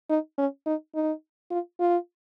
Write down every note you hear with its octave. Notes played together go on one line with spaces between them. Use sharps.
D#4
C#4
D#4
D#4
F4
F4